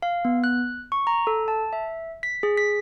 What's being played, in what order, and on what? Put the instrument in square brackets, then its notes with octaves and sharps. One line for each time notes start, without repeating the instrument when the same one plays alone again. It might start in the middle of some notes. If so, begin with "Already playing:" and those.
[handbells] F5
B3
F#6
C#6
A#5
A4
A5
E5
B6
G#4
B6